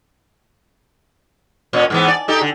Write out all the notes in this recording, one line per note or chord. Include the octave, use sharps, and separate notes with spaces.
A#2 C#4
G#2 E3 B3
D5
D#4 G4 A4
D3